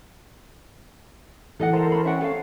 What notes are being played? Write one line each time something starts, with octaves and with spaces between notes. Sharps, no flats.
E3 A4 D#5 F#5
E4 A4 A#4 C5
C#4 B5
C#4 E5 F#5 G5
A4 F5